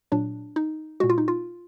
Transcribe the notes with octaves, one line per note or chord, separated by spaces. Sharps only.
A#2 F#3 D4
D#4
A#2 G#3 F#4
F4
D#4
F4